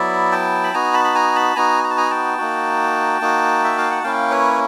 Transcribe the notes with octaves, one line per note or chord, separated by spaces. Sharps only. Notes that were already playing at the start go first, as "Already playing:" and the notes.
Already playing: F#3 B3 E4 D5 E5
G5 A5
B5
B3 D#4 F#4 G#5 A#5
A5 B5
B5
G#5 A#5
A5 B5
B3 D#4 F#4 G#5 A#5
A#5
A5
G#5 A#5
G5 A5
A#3 D#4 F#4
A#3 D#4 F#4
E5
F5
F#5
A#3 C#4 E4 F5 G5
B4 C#5